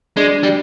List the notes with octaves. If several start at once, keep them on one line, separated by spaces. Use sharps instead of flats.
G#3 D4
G3